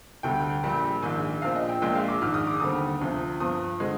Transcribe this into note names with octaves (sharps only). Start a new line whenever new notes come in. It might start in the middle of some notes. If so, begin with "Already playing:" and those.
D2 D3 G3 G5
A#1 A#2 G3
A#1 G#2 D#3 G#5
A#1 A#2 F3 C4 F5
D#5
G5
A#1 A#2 G#3 G5
F5
D6
A#1 G#2 D#3 F6
D#6
D6
D#2 D3 G3 C4 D#6
D2 C3 F3
G2 F3 C4 D#6
D3 G#3 C4